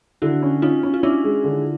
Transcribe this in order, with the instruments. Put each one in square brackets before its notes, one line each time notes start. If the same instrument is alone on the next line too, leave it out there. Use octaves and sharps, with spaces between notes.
[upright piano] D3 [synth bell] E4 F#4
[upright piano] C#4
[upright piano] C#4 [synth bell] D#4 F4
[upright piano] C#4
[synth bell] F4
[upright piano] C#4 [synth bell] D4 E4
[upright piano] G#3
D3